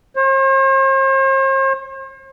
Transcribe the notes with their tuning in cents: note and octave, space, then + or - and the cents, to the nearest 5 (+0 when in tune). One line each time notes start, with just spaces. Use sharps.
C5 +45